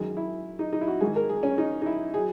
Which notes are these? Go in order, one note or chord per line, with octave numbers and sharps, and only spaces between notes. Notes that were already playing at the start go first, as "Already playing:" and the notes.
Already playing: F#2 D#3 G#3 G#4
E4
D#4
D#4
E4
F#4
G#2 D#3 G#3 G#4
A#4
G#4
C#4
D#4
D#4
E4
F#3 G#4